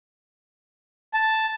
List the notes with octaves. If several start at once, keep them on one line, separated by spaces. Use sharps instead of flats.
A5